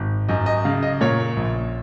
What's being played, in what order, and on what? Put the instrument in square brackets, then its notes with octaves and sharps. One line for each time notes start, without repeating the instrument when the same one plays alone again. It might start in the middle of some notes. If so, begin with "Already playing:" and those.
Already playing: [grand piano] G#1
F#2 D#5
D#5
C#3 F5
D#5
A#2 C#5
A#1